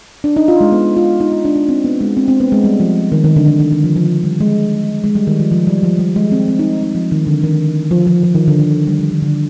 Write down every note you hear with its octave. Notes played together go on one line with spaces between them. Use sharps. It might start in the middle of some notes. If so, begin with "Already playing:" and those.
D4
D#4
F4
G#3
B3
F4
D#4
F4
D4
D4
C4
B3
G#3
C4
C4
B3
G#3
G3
F3
D#3
D#3
D3
D#3
D#3
D#3
F3
F3
G3
G#3
G#3
G3
D#3
F3
F3
G3
F3
G3
G#3
C4
C4
D#4
D#4
F3
D#3
D3
D#3
F3
F3
F3
D#3
D3
D#3
G3
F3
D#3
D3